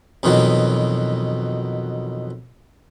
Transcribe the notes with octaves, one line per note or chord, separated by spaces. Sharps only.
F2 B2 D#3 E3 F#3